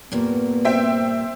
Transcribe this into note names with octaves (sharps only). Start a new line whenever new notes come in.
G2 A#2 A#3 B3
C4 E5 G5